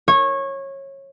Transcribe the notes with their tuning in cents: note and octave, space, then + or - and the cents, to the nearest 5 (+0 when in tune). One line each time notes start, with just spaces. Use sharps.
C#5 -20